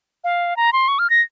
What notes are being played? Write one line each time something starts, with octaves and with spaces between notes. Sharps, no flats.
F5
A#5
C6
C#6
F6
A#6